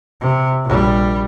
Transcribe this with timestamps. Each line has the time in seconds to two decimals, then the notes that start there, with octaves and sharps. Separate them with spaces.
0.21 C3
0.64 A#1 G3